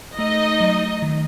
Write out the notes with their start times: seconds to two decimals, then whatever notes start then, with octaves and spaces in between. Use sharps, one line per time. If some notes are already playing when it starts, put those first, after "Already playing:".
0.18 A3 D#4 D#5
0.60 F#3
1.02 D#3